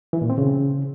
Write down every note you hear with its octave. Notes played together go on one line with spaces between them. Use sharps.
E3
A#2
C4
C#3